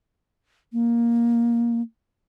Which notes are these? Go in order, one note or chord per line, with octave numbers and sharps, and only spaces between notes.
A#3